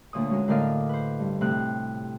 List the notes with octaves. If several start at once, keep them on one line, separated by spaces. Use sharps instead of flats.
D2 A#2 C#5 D#6
G#3 C#4 F#4 A#4
A2 D3 A#4 D5 D#5 F5
B4 C5
G2
A2 C3 C4 F#6